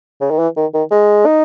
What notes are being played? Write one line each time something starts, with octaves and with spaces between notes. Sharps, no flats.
C#3
D#3
E3
D#3
D#3
G#3
D#4